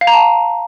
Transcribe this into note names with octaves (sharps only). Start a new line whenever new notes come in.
F5
A#5
A5